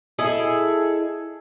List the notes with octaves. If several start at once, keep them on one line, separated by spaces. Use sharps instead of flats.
E4 G#4 A4 D#5